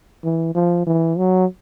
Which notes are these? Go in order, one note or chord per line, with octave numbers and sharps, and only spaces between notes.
E3
F3
E3
F#3